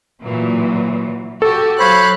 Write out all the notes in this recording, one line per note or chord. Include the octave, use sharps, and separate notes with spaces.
A#2 E3 F#3
F#4 G4 A4
F#3 C5 C#5 F5 B5 F#6